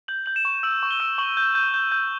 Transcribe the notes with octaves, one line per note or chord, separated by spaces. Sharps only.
G6 F#7
G6 F#7
E7
C#6
E6 F#7
C#6
G7
E6
C#6 F#7
G6
G6
G6
G6